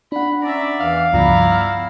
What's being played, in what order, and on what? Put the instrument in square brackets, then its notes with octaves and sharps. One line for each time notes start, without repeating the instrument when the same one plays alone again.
[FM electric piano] D4 F#5 [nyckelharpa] B5
[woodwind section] C#4 A#5 [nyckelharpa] D5 E5
[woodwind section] E2 D#3 E3 [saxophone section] F5
[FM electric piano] C#2 G2 F3 [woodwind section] B3 D5 A#5 [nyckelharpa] E4
[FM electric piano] E6